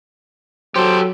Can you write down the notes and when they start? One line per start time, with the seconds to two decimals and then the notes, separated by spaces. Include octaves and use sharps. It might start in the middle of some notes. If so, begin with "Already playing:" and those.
0.76 F#3 G4 A4 C5